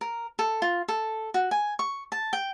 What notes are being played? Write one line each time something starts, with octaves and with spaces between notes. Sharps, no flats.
A#4
A4
F4
A4
F#4
G#5
C#6
A5
G5